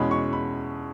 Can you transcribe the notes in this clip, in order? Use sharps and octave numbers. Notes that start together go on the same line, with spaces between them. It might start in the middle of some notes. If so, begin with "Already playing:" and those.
Already playing: E2 B2 G#3 C#4 B5
C#6
B5